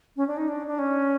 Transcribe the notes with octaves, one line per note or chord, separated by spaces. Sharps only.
C#4
D4
D#4
D4
D4
C#4